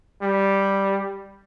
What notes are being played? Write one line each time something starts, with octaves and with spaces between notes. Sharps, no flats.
G3